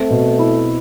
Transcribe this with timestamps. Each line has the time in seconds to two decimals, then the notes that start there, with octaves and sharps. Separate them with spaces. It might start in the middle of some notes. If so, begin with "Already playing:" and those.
Already playing: A3 C4
0.10 B2
0.39 E4